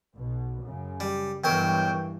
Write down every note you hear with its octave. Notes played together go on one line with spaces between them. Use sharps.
B1 B2
F#2 C#3
G3
B1 G2 E3 F#3 A#4 G5